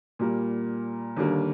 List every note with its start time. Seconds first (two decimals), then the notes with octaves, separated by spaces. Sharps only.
0.19 A#2 G3 A#3
1.16 D#2 D3 G3 A#3